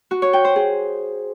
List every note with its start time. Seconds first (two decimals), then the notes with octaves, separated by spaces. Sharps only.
0.11 F#4
0.22 C#5
0.33 G5
0.45 C5
0.56 G#4